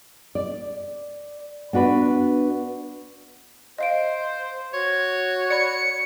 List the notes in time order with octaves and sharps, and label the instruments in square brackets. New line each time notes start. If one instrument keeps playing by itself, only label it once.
[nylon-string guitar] D5
B3 D4 F#4 B4
[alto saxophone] C5 [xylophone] D#5 F5 D7
[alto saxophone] F#4 [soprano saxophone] C#5
[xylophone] D5 B5 [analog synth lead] C#7